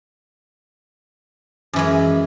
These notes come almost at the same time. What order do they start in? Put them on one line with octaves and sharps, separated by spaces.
F#2 E3 G#3